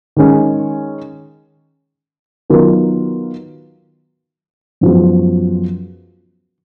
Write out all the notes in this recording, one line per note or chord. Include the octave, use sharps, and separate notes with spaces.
D#3 G#3 C#4
D#3 F#3 B3 F4 A#4
F#2 F3 G#3 B3 F#4